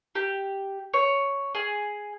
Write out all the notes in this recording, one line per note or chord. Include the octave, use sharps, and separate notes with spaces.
G4
C#5
G#4